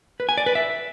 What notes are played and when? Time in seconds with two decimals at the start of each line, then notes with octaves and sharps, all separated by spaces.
0.20 B4
0.29 G#5
0.38 D5
0.46 B4
0.55 E5